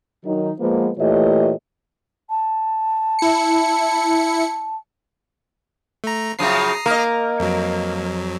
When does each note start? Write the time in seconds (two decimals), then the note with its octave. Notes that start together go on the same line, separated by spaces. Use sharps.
0.24 D#3 F#3 D#4
0.60 F3 G#3 A#3 B3
0.98 A#2 E3 A3 G4 C#5 D#5
2.30 A5
3.19 E4 C#7
6.04 A3 A#5
6.39 F#2 C#3 F3 A#5 D#6 C7
6.86 A#3 A#4 D#5
7.40 F2 F#3